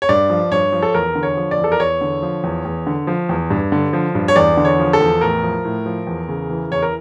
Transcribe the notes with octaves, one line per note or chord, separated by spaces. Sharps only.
C#5
G2 D5
F3
G2 C#5
F3
A4
E2 A#4
D3
C#5
F3
D5
E2
A4
A#4
E2 C#5
D3
F3
E2
E2
D3
F3
E2
G2
D3
F3
G2
C#5
E2 D5
D3
C#5
F3
A4
E2
A2 A#4
F3
A2
F3
E2
C#3
E3
E2 C#5
A#4